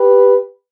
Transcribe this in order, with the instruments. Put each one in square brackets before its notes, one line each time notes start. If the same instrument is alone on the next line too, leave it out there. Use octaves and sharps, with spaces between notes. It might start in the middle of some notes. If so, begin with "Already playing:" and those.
Already playing: [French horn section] G4 B4